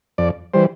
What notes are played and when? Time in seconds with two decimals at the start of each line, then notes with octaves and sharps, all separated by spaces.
0.18 F2 D5
0.54 E3 G3 C5